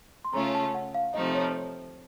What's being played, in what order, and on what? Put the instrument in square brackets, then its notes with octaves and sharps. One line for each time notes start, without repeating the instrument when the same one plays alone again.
[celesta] C6
[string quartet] C#3 A3 C#4 F4 [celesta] A#5
[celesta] A5
F#5
F5
[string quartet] C3 F3 A3 D#4 [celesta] D#5
[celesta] C#5